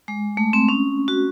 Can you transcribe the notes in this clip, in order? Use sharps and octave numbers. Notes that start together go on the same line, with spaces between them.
G#3
A3
C4
C#4
F#4